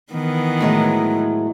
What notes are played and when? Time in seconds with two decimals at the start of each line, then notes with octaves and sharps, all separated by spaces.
0.12 D#3 E3 B3
0.60 A2 F#3 G#3